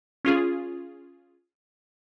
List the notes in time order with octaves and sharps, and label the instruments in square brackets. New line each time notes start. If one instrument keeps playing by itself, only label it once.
[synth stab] C#4 F4 G#4